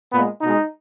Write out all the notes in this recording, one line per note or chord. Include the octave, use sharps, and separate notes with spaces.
A#2 G#3 B3
B2 G#3 D#4